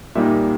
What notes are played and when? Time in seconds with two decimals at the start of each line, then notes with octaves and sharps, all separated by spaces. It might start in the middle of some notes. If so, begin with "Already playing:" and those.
0.15 A#2 G3 A#3 D#4 E5